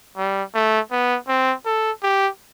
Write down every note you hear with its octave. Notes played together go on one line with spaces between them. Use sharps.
G3
A3
B3
C4
A4
G4